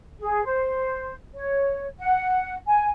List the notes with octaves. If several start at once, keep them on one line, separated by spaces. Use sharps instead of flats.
G#4
C5
C#5
F#5
G#5